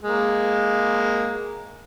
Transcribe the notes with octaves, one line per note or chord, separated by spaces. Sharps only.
G#3 A#3